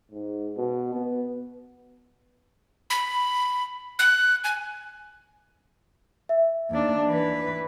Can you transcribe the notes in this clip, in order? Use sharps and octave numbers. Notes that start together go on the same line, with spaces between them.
G#2
B2
B3
B5
F#6
G#5
E5
D#2 D4
E3 B4